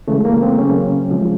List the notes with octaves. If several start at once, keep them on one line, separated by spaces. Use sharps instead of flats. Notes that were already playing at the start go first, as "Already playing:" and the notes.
C#3 E3 G#3 A3
A#3
C4
C#3 F#3 C#4
C3 F3 G#3